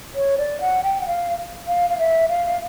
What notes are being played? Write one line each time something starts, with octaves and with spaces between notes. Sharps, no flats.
C#5
D5
F#5
G5
F#5
F5
F5
F5
E5
F5